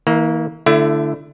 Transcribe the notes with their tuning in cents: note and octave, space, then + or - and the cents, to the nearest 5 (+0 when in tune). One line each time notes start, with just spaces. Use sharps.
E3 -40 A#3 +0
D3 +0 A3 +0 E4 +30